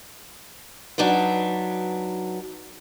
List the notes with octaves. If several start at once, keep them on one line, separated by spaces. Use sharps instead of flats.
F#3 D4 D#4 B4